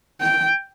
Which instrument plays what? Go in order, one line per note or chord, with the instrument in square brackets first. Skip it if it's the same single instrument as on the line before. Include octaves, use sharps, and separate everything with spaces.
[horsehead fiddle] G5